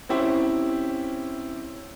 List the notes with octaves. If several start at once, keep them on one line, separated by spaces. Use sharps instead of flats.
C4 C#4 E4 G4 C5